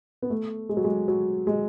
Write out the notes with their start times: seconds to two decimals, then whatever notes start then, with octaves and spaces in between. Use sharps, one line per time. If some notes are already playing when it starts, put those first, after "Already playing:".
0.22 B3
0.30 A3
0.69 G#3
0.77 F#3
0.84 G#3
1.08 F#3
1.47 G#3